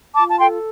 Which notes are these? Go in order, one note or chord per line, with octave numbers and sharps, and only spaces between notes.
F4 A5 D6
A5
A4 G5 C6